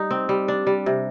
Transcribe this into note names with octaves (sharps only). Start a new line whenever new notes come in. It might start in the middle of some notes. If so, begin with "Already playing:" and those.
Already playing: G3 D#4
C4
G3
D4
G3
C3